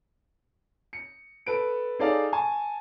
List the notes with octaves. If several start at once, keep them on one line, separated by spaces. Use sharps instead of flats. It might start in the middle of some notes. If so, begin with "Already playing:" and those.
C#7
A4 B4 D7
D#4 G#4 A4 D5 F5
G#5 A5 C#6